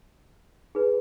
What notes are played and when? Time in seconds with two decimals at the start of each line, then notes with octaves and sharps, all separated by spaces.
0.75 D#4 G#4 B4